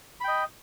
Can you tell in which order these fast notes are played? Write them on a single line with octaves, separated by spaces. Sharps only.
B5 G5 D#5